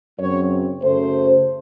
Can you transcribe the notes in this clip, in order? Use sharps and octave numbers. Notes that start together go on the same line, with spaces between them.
F#2 C#3 F#3 C4 C#5
F#2 C#3 F#3 A3 C5